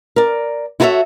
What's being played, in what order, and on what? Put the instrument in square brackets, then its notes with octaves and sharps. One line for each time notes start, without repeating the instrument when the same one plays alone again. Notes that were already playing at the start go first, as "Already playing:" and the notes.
[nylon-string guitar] A#4 D5
E4 F#4 A4 A#4 C#5 E5